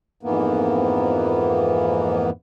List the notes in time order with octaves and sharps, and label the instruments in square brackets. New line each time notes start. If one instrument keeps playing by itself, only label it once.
[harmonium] F2 G#2 E3 A#3 B3